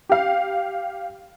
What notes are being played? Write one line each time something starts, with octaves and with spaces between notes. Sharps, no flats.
G4 F5